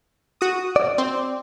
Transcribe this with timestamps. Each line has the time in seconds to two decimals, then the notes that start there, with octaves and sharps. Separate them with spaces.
0.41 F#4 D#6
0.76 D5
0.98 C4